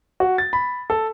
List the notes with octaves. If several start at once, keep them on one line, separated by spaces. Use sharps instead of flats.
F#4
A6
B5
A4